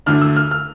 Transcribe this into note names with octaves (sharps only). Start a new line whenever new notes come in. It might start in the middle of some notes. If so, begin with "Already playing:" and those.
D2 D3 A3 D4 F6
E6
F6
F6